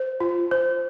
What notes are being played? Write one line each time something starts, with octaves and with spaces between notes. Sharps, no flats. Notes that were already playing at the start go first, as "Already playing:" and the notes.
Already playing: C5
F4
C5